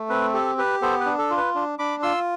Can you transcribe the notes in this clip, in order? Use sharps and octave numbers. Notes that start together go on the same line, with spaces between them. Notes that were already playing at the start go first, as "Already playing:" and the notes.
Already playing: A3
C4 B4
G4 A4
G4 B4
B3 A4 C5
B4
D4
A4
F4
B4
D4
D4 B5 D6
F4 C6 E6